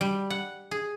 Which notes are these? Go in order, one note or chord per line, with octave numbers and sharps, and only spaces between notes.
G3
F#5
G#4